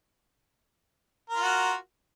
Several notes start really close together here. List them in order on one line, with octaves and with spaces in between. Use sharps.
A#4 F4 F#4